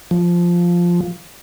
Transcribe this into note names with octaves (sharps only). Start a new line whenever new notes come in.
F3